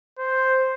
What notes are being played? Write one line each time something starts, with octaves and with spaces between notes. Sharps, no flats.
C5